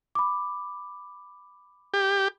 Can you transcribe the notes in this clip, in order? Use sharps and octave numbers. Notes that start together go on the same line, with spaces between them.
B5 D6
G4